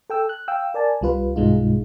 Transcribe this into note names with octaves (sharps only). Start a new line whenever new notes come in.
A4 G5 E6
F#6
F5 G5 E6
A#4 D5 G#5 A5
C2 G3 F4 B4
B1 G2 B2 G#3 D#4 F4